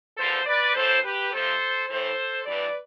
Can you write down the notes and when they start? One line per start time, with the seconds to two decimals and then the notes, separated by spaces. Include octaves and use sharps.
0.17 E2 D3 F3 A4 C5
0.46 B4 D5
0.74 A2 E3 A4 C5
1.03 G4 B4
1.32 F2 C3 F3 A4 C5
1.89 A2 E3 A4 C5
2.46 G2 E3 B4 D5